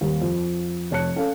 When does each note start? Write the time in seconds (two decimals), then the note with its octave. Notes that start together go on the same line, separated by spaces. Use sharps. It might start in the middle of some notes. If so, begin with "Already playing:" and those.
0.01 D#2 G3
0.22 F2
0.91 F1 C#5 A5 F#6 C#7
1.16 C#4 A4 F5